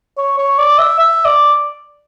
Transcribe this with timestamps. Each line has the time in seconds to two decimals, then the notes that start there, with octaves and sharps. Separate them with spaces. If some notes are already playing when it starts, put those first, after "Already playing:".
0.18 C#5
0.38 C#5
0.59 D5
0.79 E5
0.98 E5
1.25 D5